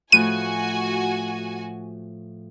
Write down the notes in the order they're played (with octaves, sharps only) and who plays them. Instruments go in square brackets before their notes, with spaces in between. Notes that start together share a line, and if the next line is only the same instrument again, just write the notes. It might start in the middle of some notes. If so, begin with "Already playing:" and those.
[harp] A2 F3 F#6 [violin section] F#4 G#5 [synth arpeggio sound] D#7